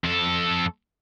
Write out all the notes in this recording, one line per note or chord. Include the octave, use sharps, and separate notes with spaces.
F2 A4